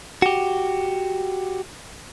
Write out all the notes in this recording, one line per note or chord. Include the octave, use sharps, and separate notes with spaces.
F#4 G4